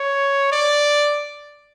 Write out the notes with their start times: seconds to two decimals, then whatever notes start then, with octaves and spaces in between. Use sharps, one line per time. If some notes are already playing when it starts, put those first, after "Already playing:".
Already playing: C#5
0.52 D5